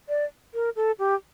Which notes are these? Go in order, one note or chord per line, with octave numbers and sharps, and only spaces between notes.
D5
A#4
A4
G4